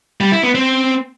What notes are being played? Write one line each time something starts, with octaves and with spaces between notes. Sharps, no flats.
G3
E4
B3
C4